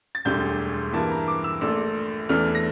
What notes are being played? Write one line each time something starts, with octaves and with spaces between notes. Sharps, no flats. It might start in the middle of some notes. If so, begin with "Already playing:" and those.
A6
E1 D2 D3 G3 G6
G2 E3 A#3 A5
A#5
D6
E6
A#1 A#2 A3 D4 E6
E2 E3 A3 D4 F6
A#6